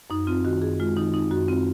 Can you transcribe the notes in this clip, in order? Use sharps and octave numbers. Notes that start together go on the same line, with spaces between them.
F#2 D#4
C4 F4
D#3 F#4
F#2 G#4
G#3 F4
D#3 D#4
C4 D#4
F#2 F#4
C4 F4